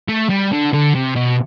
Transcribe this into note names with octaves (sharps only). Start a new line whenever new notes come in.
A3
G3
D3
D3
C3
B2